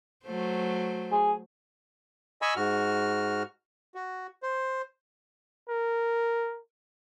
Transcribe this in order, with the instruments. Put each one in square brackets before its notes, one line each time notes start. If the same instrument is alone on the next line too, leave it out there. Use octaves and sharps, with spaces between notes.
[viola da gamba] F#3 A3 C5
[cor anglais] G#4
[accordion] D#5 G#5 B5 C#6 E6
G#2 F#4 F6
F#4
C5
[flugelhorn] A#4